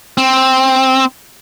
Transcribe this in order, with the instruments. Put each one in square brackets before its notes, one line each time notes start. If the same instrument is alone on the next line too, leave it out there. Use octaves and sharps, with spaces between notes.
[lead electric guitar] C4